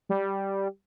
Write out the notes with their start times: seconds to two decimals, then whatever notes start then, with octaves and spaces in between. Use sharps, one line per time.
0.09 G3